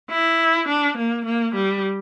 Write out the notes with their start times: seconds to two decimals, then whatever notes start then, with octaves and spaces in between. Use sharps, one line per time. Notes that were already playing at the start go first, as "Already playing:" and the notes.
0.10 E4
0.68 D4
0.97 A#3
1.26 A#3
1.55 G3